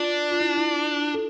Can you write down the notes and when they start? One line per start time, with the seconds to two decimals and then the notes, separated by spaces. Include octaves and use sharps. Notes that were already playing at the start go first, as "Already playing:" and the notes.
Already playing: D4 F4
0.32 F4
0.41 E4
0.57 E4
1.14 A4